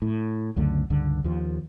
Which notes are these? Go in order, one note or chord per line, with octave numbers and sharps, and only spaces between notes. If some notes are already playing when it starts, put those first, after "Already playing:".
A2
C#2 F#2 D3 A3
C#2 G2 D3
D#2 F3